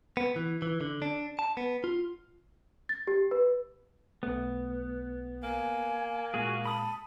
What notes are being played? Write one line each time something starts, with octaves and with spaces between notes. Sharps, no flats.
B3
E3
E3
D3
D4
A5
B3
F4
A6
G4
B4
B1 A3 B3
A#3 G#5
A#2 G#3 F#4 G#4
A5 B5 D#6